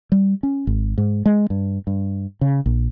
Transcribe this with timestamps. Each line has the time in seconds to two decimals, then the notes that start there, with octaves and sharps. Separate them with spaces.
0.12 G3
0.43 C#4
0.67 G#1
0.98 G#2
1.26 G#3
1.50 G2
1.87 G2
2.41 C#3
2.66 A#1